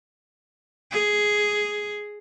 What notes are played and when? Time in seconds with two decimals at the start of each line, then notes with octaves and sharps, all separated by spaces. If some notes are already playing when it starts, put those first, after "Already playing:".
0.92 G#4